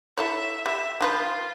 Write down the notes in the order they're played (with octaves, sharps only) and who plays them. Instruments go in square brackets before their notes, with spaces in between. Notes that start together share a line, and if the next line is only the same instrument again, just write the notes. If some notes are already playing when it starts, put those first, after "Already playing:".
[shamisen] E4 A4 C#5 [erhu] E5
[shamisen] G3 [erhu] E5
[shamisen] D#3 F3 B4 [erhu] F4